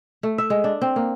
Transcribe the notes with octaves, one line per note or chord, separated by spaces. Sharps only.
A3
E5
G#3
D4
C4
A#3